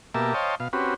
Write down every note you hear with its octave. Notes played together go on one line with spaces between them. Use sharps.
B2 A#3 G4 A#4 E5 A5
C5 C#5 D#5 F5 G5 A5
B2 F5
C4 C#4 F#4 G4 B4